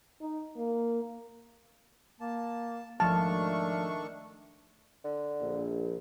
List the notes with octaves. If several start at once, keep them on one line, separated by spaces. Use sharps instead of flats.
D#4
A#3
A#3 A5
G#1 D#3 F3 A3 D4 A5 C#6 F6
D3
A#1